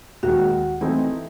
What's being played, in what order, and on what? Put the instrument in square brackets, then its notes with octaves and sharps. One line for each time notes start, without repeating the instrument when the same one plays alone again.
[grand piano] D#2 D#3 G#3 [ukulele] F#4
[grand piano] E3 A3 C4 D#4 [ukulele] E4